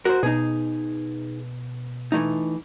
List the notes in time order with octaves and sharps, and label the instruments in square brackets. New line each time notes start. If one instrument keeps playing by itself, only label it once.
[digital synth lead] F#4 [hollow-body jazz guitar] A#4 C5
[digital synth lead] B2 [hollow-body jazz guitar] D#4 G#4
[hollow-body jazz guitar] E3 A3 D#4